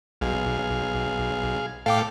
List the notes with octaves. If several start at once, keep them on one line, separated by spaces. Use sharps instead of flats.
B1 G#4 F5
A2 A4 F5 G5 D6